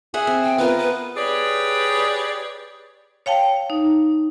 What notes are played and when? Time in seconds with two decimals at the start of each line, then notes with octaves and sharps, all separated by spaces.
0.14 G#4 E5 F#5
0.27 C4
0.44 G5
0.58 B3 F4 A#4 B4
0.78 B4
1.17 G4 G#4 B4 C#5 D5
3.26 C#5 F5 G5 A5
3.70 D#4